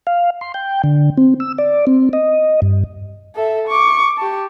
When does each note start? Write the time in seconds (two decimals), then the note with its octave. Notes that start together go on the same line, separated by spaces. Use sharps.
0.07 F5
0.41 C6
0.54 G5
0.84 D3
1.18 C4
1.40 E6
1.58 D5
1.87 C4
2.13 D#5
2.62 G2
3.35 A4 E5
3.68 C#6 D6
4.18 G4 A5